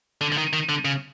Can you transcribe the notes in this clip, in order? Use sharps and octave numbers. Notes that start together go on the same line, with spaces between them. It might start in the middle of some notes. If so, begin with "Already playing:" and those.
D3
D3
D#3
D#3
D3
C#3